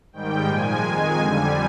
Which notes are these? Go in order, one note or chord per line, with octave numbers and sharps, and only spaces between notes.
G#2 D#3 G3 G5
A#2 F3 G#3 G#5
F2 D#3 G#3
F2 D3 G3